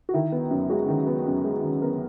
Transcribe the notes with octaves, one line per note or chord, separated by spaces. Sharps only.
F#4
D#3 E4
B3
F#2
G#3 F#4
D#3
B3
F#2
G#3
D#3
B3 A#4